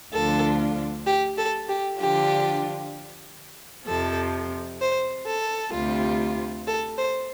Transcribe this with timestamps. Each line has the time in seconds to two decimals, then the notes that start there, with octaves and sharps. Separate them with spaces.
0.12 D2 D3 F3 D4 F4 A4
1.06 G4
1.37 A4
1.68 G4
1.99 D3 F3 D4 F4 G4
3.86 F2 C3 F3 A4
4.80 C5
5.25 A4
5.72 D2 C3 G3 F4
6.66 A4
6.97 C5